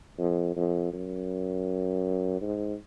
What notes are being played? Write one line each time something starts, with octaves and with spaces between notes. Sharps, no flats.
F2
F2
F#2
G#2